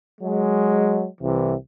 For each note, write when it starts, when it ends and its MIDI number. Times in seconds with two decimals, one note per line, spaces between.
0.20 1.05 54
0.20 1.05 56
1.20 1.53 36
1.20 1.53 48
1.20 1.53 52